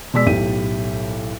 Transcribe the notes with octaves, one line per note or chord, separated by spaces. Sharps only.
B2 G#3 D5 E6 B6
B1 A2 G4 D#7